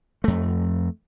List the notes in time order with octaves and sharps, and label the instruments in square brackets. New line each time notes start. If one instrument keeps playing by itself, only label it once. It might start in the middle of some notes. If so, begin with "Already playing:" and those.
[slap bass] F2 A3